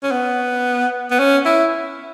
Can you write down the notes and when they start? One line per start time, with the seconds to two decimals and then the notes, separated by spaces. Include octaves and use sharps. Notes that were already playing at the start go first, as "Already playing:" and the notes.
0.03 C#4
0.11 B3
1.11 B3
1.19 C#4
1.46 E4